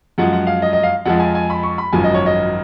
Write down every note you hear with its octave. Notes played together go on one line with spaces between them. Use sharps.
F#2 F3 G#3 F#5
F#5
F5
D#5
D#5
F5
F2 F3 G#3 F#5
G#5
G#5
B5
C#6
B5
G#1 F#2 F3 G#5
D#5
C#5
D#5